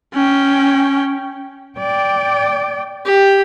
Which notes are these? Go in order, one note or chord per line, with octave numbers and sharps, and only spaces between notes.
C#4 G5
D5 G5
G4